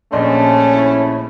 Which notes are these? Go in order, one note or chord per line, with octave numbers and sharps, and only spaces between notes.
A#1 A3 C#4 D4 D#5 C6
E4